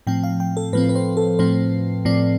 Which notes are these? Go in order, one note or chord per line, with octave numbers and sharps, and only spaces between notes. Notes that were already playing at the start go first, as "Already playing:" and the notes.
A2 F3 C4 G5
F5
G5
A4
A2 F3 C4 B4
B4
C5
A4
A2 F3 C4 C5
A2 F3 C4 D5